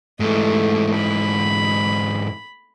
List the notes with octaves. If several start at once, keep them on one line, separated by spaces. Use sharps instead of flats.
G#2 E3 A3
B5